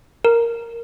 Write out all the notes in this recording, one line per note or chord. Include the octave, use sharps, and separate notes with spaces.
A#4